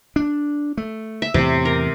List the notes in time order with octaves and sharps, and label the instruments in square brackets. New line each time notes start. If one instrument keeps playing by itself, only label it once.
[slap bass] D4
A3
[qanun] E5
[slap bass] E2 A2 [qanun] C3
[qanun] A#4